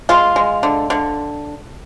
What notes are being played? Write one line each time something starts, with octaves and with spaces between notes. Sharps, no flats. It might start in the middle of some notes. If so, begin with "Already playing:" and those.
G#3 F4
G#3
D3
D3